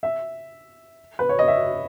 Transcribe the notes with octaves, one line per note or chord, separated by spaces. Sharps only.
E5
B4
C#5
D#5
E5